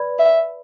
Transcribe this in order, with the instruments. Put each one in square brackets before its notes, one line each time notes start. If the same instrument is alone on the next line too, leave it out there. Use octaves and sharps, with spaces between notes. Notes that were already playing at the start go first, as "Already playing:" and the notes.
Already playing: [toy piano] B4 D5 B5
[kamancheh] E5